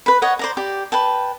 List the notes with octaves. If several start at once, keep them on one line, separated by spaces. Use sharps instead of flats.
B4 B5
C#5 D#5 F#5
C5 D5 A#5
G4 D5
B4 G5 A5